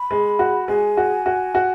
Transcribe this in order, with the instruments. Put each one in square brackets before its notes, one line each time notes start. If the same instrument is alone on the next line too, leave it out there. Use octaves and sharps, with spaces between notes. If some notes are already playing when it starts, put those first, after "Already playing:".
Already playing: [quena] B5
[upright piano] G#3
F#4
[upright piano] G#3 [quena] G#5
[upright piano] F#4
F#4
F#4